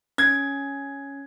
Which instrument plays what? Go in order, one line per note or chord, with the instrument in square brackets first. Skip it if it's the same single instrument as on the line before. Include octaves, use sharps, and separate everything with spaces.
[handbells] C#4 [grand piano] G#6